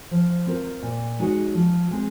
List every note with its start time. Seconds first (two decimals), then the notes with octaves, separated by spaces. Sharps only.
0.11 F3
0.47 C4 F4 A#4
0.83 A#2
1.19 G#3 D#4 F#4 C#5
1.54 F3
1.91 G#3 C4